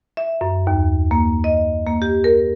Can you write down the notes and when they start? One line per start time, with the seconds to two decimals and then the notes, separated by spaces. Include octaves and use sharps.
0.17 E5
0.41 F#2
0.67 D#2
1.11 A#3
1.44 D#5
1.87 A#3
2.02 G4
2.24 A#4